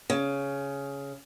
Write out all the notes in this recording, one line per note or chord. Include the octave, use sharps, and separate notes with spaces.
C#3